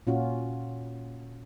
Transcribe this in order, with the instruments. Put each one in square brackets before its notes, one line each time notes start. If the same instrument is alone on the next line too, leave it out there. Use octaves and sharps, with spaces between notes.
[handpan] A#2 C#4 F4 F#4